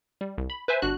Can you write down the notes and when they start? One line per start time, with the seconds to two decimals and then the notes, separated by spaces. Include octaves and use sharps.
0.21 G3
0.38 C2
0.50 B5
0.68 B4 C5 E5 G#5
0.82 G1 D4 F#4 F#6